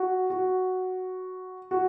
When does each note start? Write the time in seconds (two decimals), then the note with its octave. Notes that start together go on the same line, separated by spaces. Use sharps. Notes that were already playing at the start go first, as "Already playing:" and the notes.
Already playing: F#4
0.30 F#4
1.71 F#4